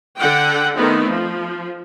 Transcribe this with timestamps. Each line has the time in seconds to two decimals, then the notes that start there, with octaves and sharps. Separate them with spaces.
0.17 D3 F#5 G5
0.75 D#3 A3 B3 C4 D#4
1.10 F3